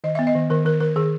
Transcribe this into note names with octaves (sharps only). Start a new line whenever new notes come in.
D#3 D#5
B3 E5
D#5
D#3
D#3 A#4
D#3 A#4
D#3 A#4
D#3 G#4